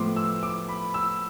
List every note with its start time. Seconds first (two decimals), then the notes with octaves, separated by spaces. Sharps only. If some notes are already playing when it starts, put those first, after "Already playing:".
Already playing: A2 F3 B3 C6 D6
0.16 E6
0.43 D6
0.68 B5
0.94 E6